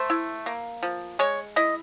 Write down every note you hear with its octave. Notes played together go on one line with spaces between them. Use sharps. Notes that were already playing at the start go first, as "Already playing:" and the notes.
Already playing: A3 C5
E4
A#3
F3
G#3 C#5
E4 D#5